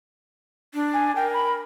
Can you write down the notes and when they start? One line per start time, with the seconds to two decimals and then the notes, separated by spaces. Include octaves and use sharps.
0.74 D4
0.93 G#5
1.16 A#4 G5
1.33 B5